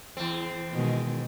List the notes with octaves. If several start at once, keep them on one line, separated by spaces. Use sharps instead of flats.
E2 C4
B2 D#3 G#3